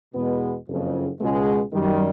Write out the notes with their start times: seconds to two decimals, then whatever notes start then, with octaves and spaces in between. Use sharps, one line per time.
0.14 E2 B2 G#3 B3
0.67 F#1 F2 C#3
1.20 C#2 B2 G#3
1.72 F#2 D#3 G3